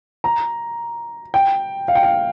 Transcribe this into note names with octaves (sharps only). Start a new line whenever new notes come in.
A#5
G5
F5
G5
F5